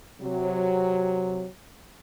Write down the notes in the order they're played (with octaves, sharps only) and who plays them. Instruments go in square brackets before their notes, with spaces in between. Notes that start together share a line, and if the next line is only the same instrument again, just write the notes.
[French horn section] C3 F#3